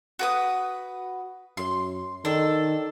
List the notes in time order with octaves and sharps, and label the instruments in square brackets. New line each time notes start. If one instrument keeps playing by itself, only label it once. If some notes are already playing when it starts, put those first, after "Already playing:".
[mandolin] F#4 B4 D#6
[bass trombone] F#2 [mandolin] C6
[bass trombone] D#3 [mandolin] D4 A4